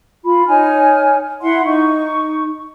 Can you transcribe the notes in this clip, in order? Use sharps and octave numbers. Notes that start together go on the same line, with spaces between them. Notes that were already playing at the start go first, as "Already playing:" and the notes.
F4 B5
D#4 C#5 G#5 F6
E4 E5 F#5 C6
D#4 C#6